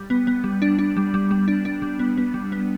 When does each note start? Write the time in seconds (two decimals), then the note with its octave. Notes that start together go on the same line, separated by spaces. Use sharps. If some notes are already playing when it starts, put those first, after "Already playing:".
Already playing: G3
0.10 B3
0.27 B3
0.44 G3
0.62 D4
0.79 D4
0.97 G3
1.14 G3
1.31 G3
1.48 D4
1.65 D4
1.82 G3
1.99 B3
2.17 B3
2.34 G3
2.52 B3